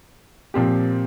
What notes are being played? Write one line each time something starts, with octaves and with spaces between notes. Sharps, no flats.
A#2 F3 C4 G4